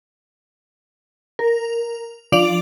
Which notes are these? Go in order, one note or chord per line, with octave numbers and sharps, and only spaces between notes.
A#4
F3 D4 D5 D7 F7 F#7